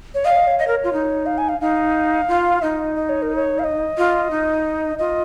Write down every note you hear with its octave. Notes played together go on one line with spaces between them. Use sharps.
C#5
D#5 F5
C#5
D#5
C#5
D#5
A#4
F4
D#4
F5
G#5
F5
D#4 F5
F4
D#4 D#5
D#5
C#5
A#4
C#5
F5
D#5
F4
D#4
F4 D#5